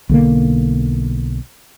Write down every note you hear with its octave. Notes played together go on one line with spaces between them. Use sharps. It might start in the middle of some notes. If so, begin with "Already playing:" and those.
B1 D3 A#3